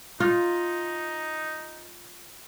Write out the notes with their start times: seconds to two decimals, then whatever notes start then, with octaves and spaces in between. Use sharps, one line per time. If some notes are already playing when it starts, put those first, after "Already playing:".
0.20 D#4 F4